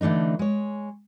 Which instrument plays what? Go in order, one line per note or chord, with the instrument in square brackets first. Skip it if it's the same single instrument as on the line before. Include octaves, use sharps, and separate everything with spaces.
[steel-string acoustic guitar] D3 E3 A3 D4 D#4
G#3 C#5